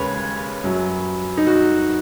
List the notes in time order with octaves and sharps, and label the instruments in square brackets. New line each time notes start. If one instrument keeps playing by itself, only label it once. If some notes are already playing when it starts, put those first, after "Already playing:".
Already playing: [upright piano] D#2 C#3 G#3 B4 C#5
F#2 F#3
D#4
F#4